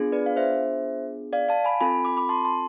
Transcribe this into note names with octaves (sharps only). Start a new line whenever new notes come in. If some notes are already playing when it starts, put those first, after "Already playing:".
Already playing: B3 D4 F4 G#4
B4 D5
F5
C5 E5
D5 F5
F5 A5
G#5 B5
C4 F4 A4 G#5 B5
B5 D6
B5 D6
A5 C6
A5 C6